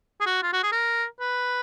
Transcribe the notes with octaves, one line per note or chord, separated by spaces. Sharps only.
G#4
F#4
F4
F#4
G#4
A#4
B4